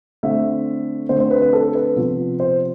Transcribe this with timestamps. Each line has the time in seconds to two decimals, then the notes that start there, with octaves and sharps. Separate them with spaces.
0.23 D3 A3 C4 E5
1.09 D3 A3 C4 C5
1.20 C5
1.31 B4
1.41 B4
1.53 A4
1.75 B4
1.96 C3 F3 B3
2.40 C5